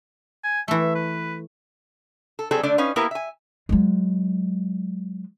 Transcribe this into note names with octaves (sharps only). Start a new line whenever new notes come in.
G#5
E3 A3 E5
B4
A4
F#3 G3 C4 G#4 A4
D3 A3 D4 D5
C#4 D#4 B4 F5
A#3 B3 E4 G4 A#4 B4
E5 G#5
F#3 G#3